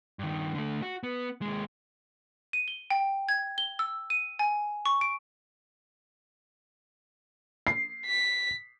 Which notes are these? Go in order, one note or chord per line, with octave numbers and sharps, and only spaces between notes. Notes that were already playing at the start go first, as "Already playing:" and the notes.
G2 D#3
D3 A3
F#4
B3
D#2 G#3
D#7
G7
G5
G#6
G7
E6
D#7
G#5
C#6
D7
C7
B6